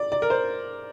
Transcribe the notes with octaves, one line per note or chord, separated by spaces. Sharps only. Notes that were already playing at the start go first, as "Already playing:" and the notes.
Already playing: D5
D5
A#4
C5